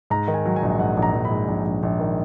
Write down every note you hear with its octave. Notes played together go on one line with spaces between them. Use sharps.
G#2 A#5
D#3
G#5
F#3
G#5
A#1
G#2 F#5
A#1
A#5
A#1
B5
G#2
A#1
A#1
A#1
D#3